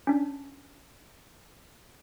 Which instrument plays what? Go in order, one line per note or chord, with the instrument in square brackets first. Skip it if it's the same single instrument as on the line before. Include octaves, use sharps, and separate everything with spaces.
[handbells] C#4 D4